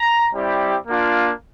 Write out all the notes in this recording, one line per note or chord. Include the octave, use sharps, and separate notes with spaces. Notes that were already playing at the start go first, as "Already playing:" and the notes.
Already playing: A#5
G3 C4 E4 G4
A#3 D4 F4